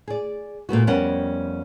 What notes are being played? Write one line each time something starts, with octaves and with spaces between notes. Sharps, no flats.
G#4 D5
A#2 A3 B3 F#4
F2 G3 B3 C#4 A#4 F#5